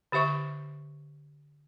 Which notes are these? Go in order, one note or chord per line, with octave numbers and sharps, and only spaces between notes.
D3 G4 C5 E5 C#6